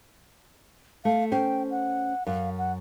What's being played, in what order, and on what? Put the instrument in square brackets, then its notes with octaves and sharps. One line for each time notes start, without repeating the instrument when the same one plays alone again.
[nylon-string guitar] A3 [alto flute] F5
[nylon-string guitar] C#4 C5 [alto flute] G5
[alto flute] F#5
[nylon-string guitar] F#2 [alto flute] F5
[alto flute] F#5